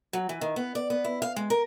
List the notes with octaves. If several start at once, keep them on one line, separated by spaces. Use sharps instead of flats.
F#3
E3
D#3
B3
D5
B3
E4
F5
G#3
A#4